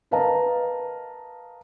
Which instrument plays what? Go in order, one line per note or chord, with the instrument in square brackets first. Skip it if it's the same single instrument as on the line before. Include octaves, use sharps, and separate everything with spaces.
[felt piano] A#4 B4 D#5 F5 A5 A#5